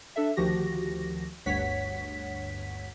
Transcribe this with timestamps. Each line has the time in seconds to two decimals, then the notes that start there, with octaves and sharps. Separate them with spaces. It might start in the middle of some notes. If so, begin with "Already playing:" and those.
0.16 D4 A4 E5
0.36 D2 D#3 F3 F#4 G4 A#6
1.46 G1 D2 G2 C#5 F#5 B6